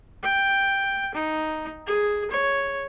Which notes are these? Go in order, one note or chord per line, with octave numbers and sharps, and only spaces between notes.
G5
D#4
G#4
C#5